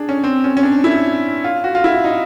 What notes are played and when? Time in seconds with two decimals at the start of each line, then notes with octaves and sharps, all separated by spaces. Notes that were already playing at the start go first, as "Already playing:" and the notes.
Already playing: D4 G#4
0.09 C#4
0.24 C4
0.44 C#4
0.57 C#4
0.63 D4
0.84 E4
1.44 F4
1.64 F#4
1.75 F4
1.84 E4
2.04 D#4